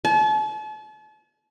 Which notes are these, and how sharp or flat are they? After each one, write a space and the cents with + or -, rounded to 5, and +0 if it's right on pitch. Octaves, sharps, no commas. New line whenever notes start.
A5 -40